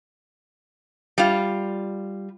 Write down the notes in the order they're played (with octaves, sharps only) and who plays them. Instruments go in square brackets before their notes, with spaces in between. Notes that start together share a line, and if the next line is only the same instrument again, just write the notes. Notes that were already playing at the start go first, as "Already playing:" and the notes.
[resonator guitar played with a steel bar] G3 F4